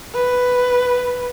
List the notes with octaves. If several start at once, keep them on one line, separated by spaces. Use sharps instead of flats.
B4